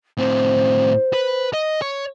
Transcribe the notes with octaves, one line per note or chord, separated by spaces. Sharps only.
A2 C4 C5
B4
D#5
C#5